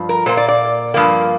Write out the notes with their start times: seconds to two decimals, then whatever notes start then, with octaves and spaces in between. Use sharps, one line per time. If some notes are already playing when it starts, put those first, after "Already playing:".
Already playing: G2 F3
0.09 A#4
0.26 A#2 A#3 C5
0.37 D5
0.48 D5
0.94 G2 F3 A#3